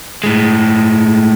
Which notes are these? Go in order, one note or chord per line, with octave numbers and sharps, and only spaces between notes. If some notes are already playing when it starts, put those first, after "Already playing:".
A2 G#3